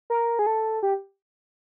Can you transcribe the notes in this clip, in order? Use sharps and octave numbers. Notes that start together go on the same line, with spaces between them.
A#4
G#4
A4
G4